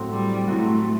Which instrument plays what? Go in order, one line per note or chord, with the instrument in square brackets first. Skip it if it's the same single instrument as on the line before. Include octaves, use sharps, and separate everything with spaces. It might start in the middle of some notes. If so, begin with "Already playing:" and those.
Already playing: [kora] A2 F#3 C4 F#4
[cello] G3
[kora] A2 F#3 C4 F#4 [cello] A3